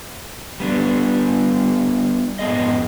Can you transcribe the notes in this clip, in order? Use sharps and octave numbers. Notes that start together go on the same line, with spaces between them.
G3 B3 D4
F2 G#2 B3 G#4 D#5